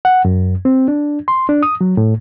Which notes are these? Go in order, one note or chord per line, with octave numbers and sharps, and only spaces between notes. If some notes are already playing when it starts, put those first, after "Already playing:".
F#5
F#2
C4
D4
C6
D4
D#6
F#3
A2